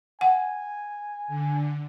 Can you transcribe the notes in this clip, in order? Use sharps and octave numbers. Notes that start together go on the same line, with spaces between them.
F#5 G#5
D3